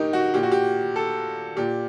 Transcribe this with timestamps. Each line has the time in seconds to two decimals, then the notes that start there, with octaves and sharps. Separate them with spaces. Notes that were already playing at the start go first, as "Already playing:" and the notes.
Already playing: A2 D#4 G4 A#4
0.13 F#4
0.34 A#2 G4
0.43 F#4
0.51 G4
0.96 A4
1.57 A#2 G4